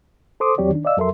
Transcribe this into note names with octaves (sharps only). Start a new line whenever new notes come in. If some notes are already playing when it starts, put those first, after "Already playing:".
A4 C5 C6 D6 D#6
E2 F#3 C4 G4 C#5 D5
D#3 D4
D5 D#5 F5 E6
F2 F#3 A4 A#4 E5 C6